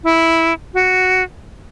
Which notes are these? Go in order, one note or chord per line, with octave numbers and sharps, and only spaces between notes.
E4
F#4